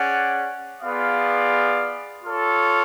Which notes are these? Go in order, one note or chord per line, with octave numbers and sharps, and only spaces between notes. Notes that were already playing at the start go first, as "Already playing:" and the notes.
Already playing: C#4 G#4 D5 F#5
B3 F4 G#4 D5 F5
F4 A4 C#5